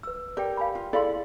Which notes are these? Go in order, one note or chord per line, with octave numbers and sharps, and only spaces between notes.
B4 E6
G4 A#4 D5 G5
F5 G#5 B5
F4
E4 G#4 A4 D5 F5 C6